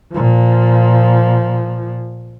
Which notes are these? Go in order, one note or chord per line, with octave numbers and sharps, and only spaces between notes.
A#2 F3